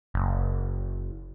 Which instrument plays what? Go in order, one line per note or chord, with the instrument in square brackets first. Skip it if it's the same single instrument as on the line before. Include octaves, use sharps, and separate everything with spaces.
[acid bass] F#1